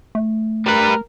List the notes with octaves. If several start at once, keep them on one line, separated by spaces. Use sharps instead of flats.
A3
G3 A#4 B4